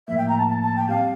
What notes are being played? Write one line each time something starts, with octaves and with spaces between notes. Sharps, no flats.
A2 F3 A#3 E5
G5
A#5
A5
A5
A5
G5
G3 C4 G4 F5